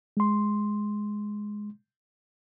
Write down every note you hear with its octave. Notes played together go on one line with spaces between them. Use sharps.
G#3 C6